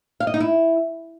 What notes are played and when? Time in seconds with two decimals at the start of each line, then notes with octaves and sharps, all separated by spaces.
0.20 F5
0.27 D#5
0.34 D#4
0.40 E4